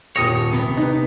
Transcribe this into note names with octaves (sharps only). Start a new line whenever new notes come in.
D#1 C#5 D#6 A#6
C3 B3
D#4 B4